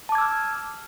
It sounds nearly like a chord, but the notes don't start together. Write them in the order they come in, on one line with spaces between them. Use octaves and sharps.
A5 D6 G#6 E6 F6